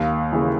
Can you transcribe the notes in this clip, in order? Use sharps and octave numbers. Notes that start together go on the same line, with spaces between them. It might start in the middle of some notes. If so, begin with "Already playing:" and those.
Already playing: D#2 F5
C#3 E3